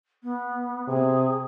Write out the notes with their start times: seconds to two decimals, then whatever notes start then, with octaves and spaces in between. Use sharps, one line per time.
0.23 B3
0.88 C3 G#4